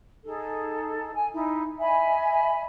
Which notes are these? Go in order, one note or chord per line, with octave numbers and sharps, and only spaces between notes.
D#4 G#4 A4
G#5
D#4 E4
D#5 E5 G#5 B5